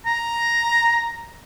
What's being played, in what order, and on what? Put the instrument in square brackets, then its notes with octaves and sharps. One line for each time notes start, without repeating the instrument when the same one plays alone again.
[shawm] A#5